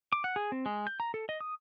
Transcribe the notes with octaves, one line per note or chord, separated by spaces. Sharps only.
D6
F#5
G#4
C4
G#3
G6
A#5
A4
D#5
D#6